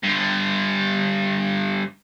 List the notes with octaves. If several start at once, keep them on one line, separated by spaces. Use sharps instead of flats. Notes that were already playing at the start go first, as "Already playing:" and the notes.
G2 D3